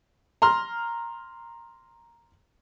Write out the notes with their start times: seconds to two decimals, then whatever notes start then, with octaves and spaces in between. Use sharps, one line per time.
0.42 A#5 C6 F6